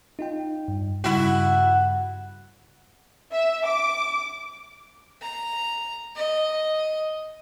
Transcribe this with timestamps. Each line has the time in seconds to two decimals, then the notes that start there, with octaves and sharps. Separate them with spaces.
0.19 D#4 F4 G5
0.68 G2
1.04 G2 C#3 G3 E4 F#4
3.33 E5
3.66 D6
5.21 A#5
6.16 D#5